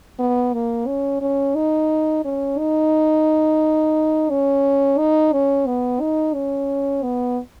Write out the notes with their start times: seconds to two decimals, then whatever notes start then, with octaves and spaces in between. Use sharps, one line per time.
0.19 B3
0.53 A#3
0.87 C#4
1.21 C#4
1.55 D#4
2.25 C#4
2.58 D#4
4.30 C#4
4.98 D#4
5.33 C#4
5.67 B3
6.00 D#4
6.34 C#4
7.03 B3